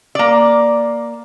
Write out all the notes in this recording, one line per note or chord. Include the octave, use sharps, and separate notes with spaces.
A#3 D5